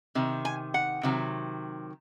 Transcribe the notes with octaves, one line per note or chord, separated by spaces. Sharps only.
C3 D#3
G#5
F#5
C3 D#3 F#3